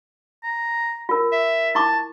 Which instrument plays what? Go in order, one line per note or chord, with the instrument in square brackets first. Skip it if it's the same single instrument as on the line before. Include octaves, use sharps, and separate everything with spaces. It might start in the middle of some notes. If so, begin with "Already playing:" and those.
[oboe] A#5
[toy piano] F4 A#4
[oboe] E5
[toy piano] E4 C#6 D6 [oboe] A5